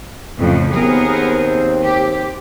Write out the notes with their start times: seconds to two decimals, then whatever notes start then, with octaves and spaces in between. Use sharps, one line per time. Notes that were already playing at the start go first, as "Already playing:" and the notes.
0.39 F2 A2 C#3
0.74 D#2 B3 C4 G#4 A#4
1.84 G4